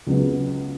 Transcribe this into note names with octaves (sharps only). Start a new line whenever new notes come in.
C#2 C#3 F#3 B3